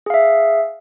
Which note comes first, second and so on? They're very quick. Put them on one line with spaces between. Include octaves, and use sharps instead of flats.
G#4 F5 E5